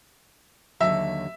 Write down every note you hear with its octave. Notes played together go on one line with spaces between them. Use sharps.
D#2 D3 F#3 E5